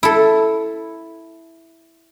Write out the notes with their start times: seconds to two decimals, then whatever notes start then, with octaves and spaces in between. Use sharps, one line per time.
0.03 E4 A4